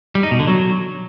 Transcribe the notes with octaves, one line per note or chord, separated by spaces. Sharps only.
G3
D#4
B2
D3
F#3